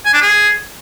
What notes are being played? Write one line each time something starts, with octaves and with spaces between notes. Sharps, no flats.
G#5
D4
G#4